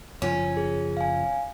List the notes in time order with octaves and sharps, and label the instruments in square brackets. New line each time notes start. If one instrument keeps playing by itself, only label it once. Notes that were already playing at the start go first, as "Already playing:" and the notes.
[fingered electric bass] F#1 F3 [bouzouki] C#4
[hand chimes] G#4
F5 G#5